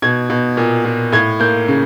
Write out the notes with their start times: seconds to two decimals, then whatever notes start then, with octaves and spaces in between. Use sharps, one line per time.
0.02 B2 G#6
0.30 B2
0.57 A#2
0.85 A#2
1.12 A2 G#6
1.40 A#3 G6
1.68 C#3